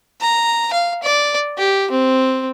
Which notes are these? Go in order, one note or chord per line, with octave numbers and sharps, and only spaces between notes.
A#5
F5
D5
G4
C4